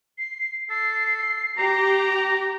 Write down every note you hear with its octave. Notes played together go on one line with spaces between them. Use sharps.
C7
A4 C7
G4 A#5